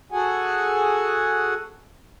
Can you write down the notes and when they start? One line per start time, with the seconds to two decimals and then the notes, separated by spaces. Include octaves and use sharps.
0.12 F#4 G#4 A4 F#5 G#5